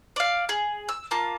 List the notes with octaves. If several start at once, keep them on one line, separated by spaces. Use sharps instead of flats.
D5 F5
G#4
E6
A#3 F4 A5